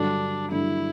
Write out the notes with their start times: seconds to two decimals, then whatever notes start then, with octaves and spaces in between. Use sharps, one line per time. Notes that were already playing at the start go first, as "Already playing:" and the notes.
Already playing: G2 D3 F#3 D4
0.51 G2 D3 F#3 E4